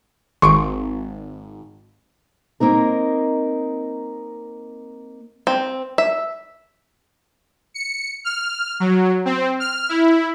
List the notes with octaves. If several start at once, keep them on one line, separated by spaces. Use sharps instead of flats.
G#1 C6 C#6 D7
A#3 C4 D#4 A#4
C4
E5
C#7
F6
F#3
C4
F6
E4